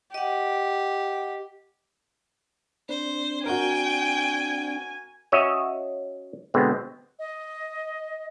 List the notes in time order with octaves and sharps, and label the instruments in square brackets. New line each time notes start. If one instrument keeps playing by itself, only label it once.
[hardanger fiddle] G4 [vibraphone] D#5 F#5
[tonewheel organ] C4 D4 [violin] C5
[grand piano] F#4 A#4 [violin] G5 [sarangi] G#5
[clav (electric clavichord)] C#4 F#4 C#5 D#5 E5
B2 D3 G#3 B3 C4
[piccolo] D#5